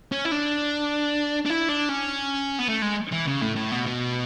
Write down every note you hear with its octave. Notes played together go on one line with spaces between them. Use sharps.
C#4
E4
D4
D4
E4
D4
C#4
B3
A3
G#3
E3
C#3
A2
A2
B2
B2